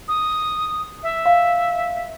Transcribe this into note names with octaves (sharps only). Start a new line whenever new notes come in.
D#6
E5
F5